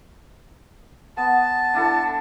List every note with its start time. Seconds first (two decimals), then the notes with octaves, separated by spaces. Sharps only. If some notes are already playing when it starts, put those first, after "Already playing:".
1.17 B3 A5
1.74 D4 E4 A4